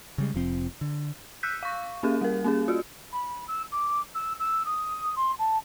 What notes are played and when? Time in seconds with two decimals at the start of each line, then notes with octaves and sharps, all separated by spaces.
0.18 C#3 G3 G#3
0.34 F1 F3 C4
0.81 D3
1.43 E6 F#6 G6 B6
1.63 F5 C#6
2.03 A#3 C#4 G4 G#4
2.21 G3 A#4
2.44 A#3 C#4 G#4
2.68 F4 F#4
3.11 B5
3.47 E6
3.71 D6
4.14 E6
4.39 E6
4.65 D#6
5.16 C6
5.38 A5